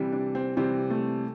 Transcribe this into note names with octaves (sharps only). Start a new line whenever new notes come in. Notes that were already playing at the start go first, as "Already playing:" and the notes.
Already playing: C3 E3 G3
D4
C4
C3 E3 G3 C4
A3